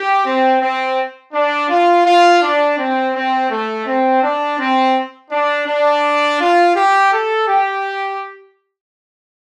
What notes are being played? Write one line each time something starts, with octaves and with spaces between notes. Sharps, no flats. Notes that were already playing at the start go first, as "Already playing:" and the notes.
Already playing: G4
C4
C4
D4
F4
F4
D4
C4
C4
A3
C4
D4
C4
D4
D4
F4
G4
A4
G4